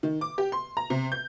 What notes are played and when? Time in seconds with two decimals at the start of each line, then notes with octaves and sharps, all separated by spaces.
0.03 D#3
0.21 D6
0.38 G4
0.52 C6
0.77 A#5
0.90 C3
1.12 G6